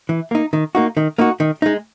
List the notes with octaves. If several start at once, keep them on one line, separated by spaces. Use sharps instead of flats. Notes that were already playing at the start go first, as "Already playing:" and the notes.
E3
A#3 D#4
D#3
A#3 D#4 F#4
D#3
A#3 D#4 F#4
D#3
G#3 D#4